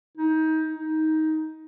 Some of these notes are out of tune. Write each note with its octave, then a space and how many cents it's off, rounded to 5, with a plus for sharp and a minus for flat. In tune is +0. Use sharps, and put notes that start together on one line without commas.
D#4 +25
D#4 +15